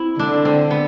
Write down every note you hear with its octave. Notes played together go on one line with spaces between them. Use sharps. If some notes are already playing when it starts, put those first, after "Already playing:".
Already playing: C4 E4
D3 D4
C4
B3